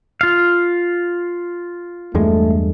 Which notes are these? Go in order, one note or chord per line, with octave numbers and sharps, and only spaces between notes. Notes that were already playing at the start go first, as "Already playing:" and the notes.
F4 F5
E2 G2 G#3 A3